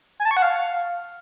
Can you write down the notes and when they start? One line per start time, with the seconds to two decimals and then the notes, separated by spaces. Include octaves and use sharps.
0.20 G#5
0.25 A5
0.31 C#6
0.37 F#5
0.42 F5